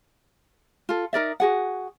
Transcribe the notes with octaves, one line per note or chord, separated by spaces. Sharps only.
F4 A4
D#4 A#4 D5 E5
F#4 G#4 F#5